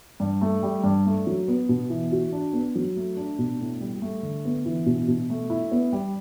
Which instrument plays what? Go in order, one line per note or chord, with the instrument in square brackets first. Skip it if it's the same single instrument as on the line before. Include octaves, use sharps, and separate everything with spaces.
[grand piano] G2
A3
G3
G2
A3
F#3
B3
B2
E3
F#4
D4
B3
F#3
A3
D4
B2
A2
G3
A3
D3
B3
E3
B2
B2
A3
E4
B3
G3